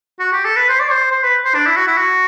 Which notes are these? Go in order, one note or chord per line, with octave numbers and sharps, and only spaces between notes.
F#4
G4
A4
B4
C5
D5
C5
C5
B4
C5
D4
E4
F#4
E4
F#4